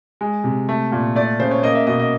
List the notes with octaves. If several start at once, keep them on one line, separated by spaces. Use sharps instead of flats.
G#3
C3
A3
A#2
A3 D5
C#3 C5
C#5
A#3 D#5
E5
B2 D#5
D#5